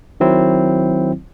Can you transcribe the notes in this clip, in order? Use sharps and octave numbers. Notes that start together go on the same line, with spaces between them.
D#3 F#3 C4 E4